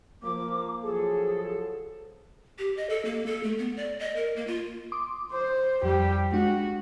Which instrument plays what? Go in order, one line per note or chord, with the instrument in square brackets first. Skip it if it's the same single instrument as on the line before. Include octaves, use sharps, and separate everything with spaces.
[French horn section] F3 A#3 [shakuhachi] D6
[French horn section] F3 F#3 A4 [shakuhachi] G#4
[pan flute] G4
D#5
A4
A#3
A4
A3
B3
D5
D#5
A#4
A#3
F4
[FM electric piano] C6 D6 D#6
[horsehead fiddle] C5
[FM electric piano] F2 [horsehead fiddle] G3 G4
[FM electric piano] G#3 D4 [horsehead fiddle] F#4